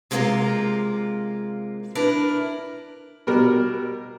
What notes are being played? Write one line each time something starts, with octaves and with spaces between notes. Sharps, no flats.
C3 G#3 A#3 C#4 F4 A#4
D4 E4 A#4 B4
B2 G3 A#4